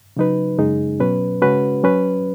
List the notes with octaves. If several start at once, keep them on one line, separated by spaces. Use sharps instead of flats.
C#3 F#3 D#4 B4
F#2 C#3 G#3 D#4 G#4
B2 F#3 C#4 B4
C#3 G#3 C#4 F#4 B4
F#3 C#4 B4